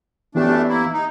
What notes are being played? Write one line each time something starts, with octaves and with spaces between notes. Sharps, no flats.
F#2 E3 A3 B3 D4 G4
A#3 E4
D#4